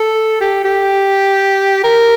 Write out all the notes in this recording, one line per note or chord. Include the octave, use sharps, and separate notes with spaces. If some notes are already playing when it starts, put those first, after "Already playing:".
Already playing: A4
G4
G4
A#4